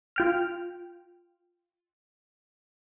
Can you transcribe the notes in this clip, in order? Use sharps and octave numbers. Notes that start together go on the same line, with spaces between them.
F4 G5 F6